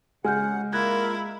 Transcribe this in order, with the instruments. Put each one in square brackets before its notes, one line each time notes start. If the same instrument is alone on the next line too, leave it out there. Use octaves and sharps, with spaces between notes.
[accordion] C#3 F#5 [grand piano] G#3 [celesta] G#5 F6 G6
[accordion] A#3 F4 A#4 [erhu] E4 [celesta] F#6 G#6 A#6